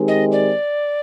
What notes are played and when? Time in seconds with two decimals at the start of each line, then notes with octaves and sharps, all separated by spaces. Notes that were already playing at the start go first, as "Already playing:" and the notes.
Already playing: D#3 G#3 C4 D#4 G4
0.08 D#5
0.32 D5